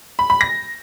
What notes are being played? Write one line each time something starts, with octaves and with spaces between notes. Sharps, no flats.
B5
B5
A#6